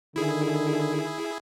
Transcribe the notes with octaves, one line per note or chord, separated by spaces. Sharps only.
D3 D#3 E4 G#4